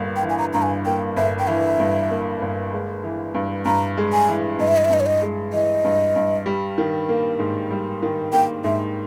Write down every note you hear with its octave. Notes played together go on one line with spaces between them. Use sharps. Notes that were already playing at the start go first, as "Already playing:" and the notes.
Already playing: G1 G2 A#3
G5
E3
G#5
A#5
G2 A#5
G#5
A#3 G5
G1 E5
G5
E3 E5
G2
A#3
G1
G#3
E3
G2
G2 A#5
G#3
G#5
E3
G2 D#5
E5
D#5
E5
G2 D#5
C#5
D#5
G#3
E3 D#5
G2
G2
G3
D#3
A#3
G#2
G3
D#3
A#3 G5
G#2 E5